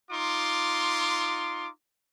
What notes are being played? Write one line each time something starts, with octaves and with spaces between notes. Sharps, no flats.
D#4 F4 C6 D6